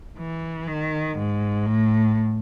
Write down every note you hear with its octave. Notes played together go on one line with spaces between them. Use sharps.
E3
D#3
G#2
A2